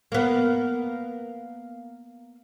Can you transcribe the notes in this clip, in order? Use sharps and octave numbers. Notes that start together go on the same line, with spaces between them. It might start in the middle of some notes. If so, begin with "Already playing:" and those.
A#3 B3